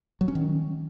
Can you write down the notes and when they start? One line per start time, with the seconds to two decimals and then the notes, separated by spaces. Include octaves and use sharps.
0.21 F#3
0.28 C#4
0.35 D#3